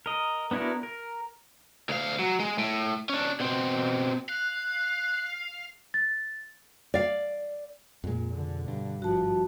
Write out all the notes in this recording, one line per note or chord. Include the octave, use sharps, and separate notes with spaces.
A#4 D#5
B3 D4 E4 F#4 A#4
A#4
D2 F5
F#3
G#3
A2
C#4 D4
B2 C4
F5 F#6
A6
D5 F5
F2 A#2 G#3
B2 D3
G2
G#1 F3 F#4 A5